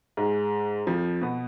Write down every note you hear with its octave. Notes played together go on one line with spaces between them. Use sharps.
G#2 G#3
F2 F3
B2 B3